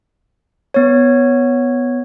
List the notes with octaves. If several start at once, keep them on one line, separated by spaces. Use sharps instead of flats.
B3 C#5